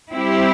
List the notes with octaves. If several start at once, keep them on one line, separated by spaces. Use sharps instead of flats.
G3 C4 E4 G4